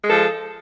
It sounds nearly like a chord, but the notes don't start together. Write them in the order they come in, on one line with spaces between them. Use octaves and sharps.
G#3 A4 F3